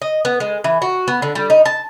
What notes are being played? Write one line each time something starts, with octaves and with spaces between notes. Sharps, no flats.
D#5
B3
G#3
E3
F#4
B3
D3
G3
D#4
A5